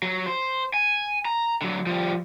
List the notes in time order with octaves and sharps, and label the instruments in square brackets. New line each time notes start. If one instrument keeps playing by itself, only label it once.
[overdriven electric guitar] F#3
C5
G#5
A#5
D3 F#3
F3 G3